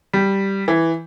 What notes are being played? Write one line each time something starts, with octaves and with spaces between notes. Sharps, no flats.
G3
E3